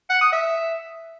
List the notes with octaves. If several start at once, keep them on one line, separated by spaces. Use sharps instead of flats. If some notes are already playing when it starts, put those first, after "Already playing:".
F#5
D#6
E5